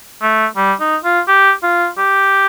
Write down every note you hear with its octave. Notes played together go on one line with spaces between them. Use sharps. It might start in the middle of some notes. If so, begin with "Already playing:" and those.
A3
G3
D#4
F4
G4
F4
G4